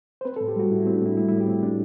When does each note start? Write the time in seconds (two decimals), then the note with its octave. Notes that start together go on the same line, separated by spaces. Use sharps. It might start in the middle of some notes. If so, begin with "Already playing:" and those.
0.21 C5
0.25 C4 B4
0.36 A4
0.41 A2
0.48 G4
0.56 G3 F#4
0.71 A2 E4
0.82 E4
0.87 C4
0.94 D4
1.02 A2 E4
1.17 G3 E4
1.28 E4
1.32 A2
1.40 G4
1.47 C4 E4
1.63 A2 D4